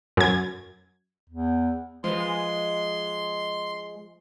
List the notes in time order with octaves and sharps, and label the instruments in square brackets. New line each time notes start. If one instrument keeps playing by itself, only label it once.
[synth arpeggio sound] F#2 G#6
[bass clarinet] E2
[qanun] F3 B4 [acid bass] G#3 [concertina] C6